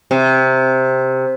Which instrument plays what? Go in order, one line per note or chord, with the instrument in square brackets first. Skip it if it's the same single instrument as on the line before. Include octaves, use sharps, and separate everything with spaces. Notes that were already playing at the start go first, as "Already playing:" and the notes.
[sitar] C3